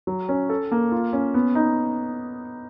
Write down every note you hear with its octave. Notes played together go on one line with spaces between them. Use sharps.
F#3
C#4
A4
A#3
F4
C#4
B3
D#4